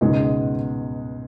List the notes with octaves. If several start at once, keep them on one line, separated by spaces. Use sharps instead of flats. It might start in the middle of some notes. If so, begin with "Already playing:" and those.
C#2 B2 G#3 B3 D#4